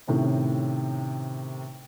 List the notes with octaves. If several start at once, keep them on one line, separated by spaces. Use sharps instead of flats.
A2 C3 D#3 C#4